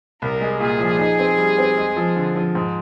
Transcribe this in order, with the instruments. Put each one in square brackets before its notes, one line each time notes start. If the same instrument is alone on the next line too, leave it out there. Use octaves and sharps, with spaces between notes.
[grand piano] C2 [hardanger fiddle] A#4
[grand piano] G#3
[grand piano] A#2 [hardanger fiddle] G#4
[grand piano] F3
D#4
C4
G3
C4
G#3
F3
D3
F3
G#2